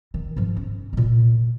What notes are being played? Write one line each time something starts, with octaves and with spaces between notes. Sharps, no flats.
D#3
G#2 F3
C#4
A#2 G#3